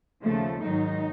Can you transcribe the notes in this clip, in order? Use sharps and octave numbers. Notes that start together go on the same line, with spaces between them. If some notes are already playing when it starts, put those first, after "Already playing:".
D#2 C#3 F3 A3
G#2 D#3 F#3 D#4